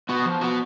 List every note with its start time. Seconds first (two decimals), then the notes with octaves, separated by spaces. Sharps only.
0.09 B3 F#4
0.25 F3
0.41 B3 F#4